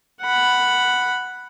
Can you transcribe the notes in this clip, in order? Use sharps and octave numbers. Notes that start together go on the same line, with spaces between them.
F#5 B5